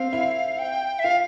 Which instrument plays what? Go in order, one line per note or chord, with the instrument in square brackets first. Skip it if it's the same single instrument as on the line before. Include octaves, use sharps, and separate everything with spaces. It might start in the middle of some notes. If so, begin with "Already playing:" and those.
Already playing: [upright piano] C4 [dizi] F5
[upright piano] E4
[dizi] G5
E5
[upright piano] F4 [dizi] F5